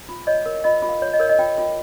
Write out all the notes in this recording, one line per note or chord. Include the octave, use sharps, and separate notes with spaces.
F4
C#5 D#5
A#4
F4 D#5
F4
F5
C#5
D#5
A#4 C#5
D#5
F4 G5
F4